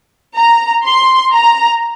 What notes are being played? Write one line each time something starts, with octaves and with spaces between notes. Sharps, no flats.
A#5
C6
A#5